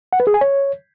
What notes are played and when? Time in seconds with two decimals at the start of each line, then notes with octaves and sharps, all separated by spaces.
0.13 F#5
0.20 B4
0.27 G#4
0.34 G#5
0.41 C#5